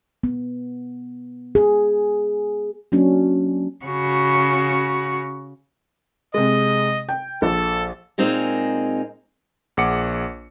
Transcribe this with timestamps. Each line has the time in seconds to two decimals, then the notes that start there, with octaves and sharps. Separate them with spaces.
0.24 B3
1.55 G#4
2.92 F#3 A#3 C#4 D4
3.85 C#3 F#4
6.34 C3 G#3 D#5
7.09 G5
7.42 A#1 A4
8.18 A#2 G#3 C4 D#4 G#4 A#4
9.77 A#1 G#4 F#5 D6 C#7